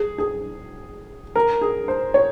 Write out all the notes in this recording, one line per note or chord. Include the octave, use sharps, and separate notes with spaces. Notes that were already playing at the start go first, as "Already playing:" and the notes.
Already playing: G#4
G#4
A#4
G#4
C5
C#5